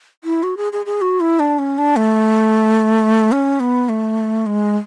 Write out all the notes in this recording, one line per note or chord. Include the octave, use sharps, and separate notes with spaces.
E4
F#4
G#4
G#4
G#4
F#4
E4
D4
C#4
D4
A3
C#4
B3
A3
G#3